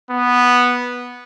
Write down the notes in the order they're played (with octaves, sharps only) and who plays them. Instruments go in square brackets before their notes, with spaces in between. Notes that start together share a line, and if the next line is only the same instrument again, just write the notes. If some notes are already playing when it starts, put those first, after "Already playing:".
[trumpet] B3